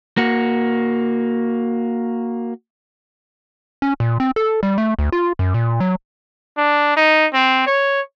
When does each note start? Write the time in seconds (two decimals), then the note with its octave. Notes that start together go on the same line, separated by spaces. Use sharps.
0.17 A#3 F#4
3.82 C#4
4.00 A#2
4.20 C4
4.36 A4
4.63 G3
4.78 A3
4.99 D2
5.12 F4
5.39 F#2
5.54 A#2
5.80 F#3
6.57 D4
6.97 D#4
7.34 C4
7.67 C#5